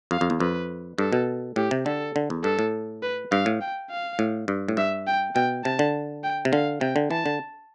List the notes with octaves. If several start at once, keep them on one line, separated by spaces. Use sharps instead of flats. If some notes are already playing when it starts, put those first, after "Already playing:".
F2 F5
F2
E2
F2 B4
G2 A4
B2
A2 G4
C3
D3 A4
D3
E2
G2 A4
A2
B4
G2 F5
A2
G5
F5
A2
G2
A2
G2 E5
G5
B2 G5
C3 A5
D3
G5
C3
D3 F5
C3 G5
D3
E3 A5
D3